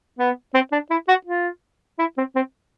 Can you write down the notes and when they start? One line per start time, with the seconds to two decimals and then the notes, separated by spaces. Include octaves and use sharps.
0.19 B3
0.54 C4
0.72 D4
0.90 E4
1.08 F#4
1.26 F4
1.99 E4
2.17 C4
2.35 C4